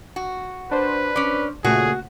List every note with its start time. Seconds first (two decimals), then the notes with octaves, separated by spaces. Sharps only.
0.16 F#4
0.71 D4 B4 C5
1.16 C#4 D5
1.64 A#2 C#3 A3 F#4 G#4